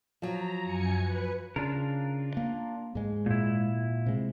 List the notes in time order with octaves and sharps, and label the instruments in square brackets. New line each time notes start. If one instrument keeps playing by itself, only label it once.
[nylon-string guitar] F3 F#3 [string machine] A#5
[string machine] F#2 G#5 C#7
B4
[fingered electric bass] C#3 [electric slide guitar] D4 F4 A#4
[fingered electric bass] A#3
G#2 G#3
[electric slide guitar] A#2 E4
[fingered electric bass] C3 G#3